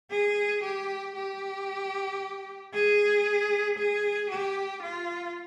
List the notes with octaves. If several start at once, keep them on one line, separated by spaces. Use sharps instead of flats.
G#4
G4
G4
G#4
G#4
G4
F4